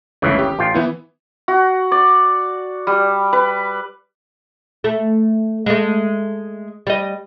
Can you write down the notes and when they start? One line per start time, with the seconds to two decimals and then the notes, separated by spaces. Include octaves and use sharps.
0.22 G1 C#2 C#3 E3 A3
0.39 G4
0.59 A1 F4 G5
0.74 E3 B3 E4
1.48 F#4
1.92 D5
2.87 G3
3.33 B4
4.84 A3
5.66 G#3 A3
6.87 G3 D#5